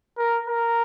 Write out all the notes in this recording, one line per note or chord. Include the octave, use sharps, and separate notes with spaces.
A#4
A#4